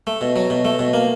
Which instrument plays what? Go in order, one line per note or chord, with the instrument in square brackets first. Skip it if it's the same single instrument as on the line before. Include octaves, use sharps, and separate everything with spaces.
[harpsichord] A3
B2
F#3
B2
A3
B2
A#3